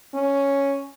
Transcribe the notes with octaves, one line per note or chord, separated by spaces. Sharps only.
C#4